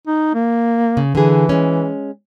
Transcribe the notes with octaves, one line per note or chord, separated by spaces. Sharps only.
D#4
A#3
C#3
D3 E3 G#4
G#3 C#4